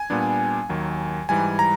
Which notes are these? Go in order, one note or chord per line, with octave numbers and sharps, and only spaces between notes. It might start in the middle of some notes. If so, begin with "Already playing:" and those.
Already playing: G#5
A#2 G3 B3 D4
D#2 D#3 F#3
G#2 E3 G3 G#5
A#5